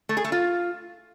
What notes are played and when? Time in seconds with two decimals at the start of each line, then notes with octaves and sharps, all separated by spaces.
0.09 A3
0.17 G#4
0.24 A3
0.32 F4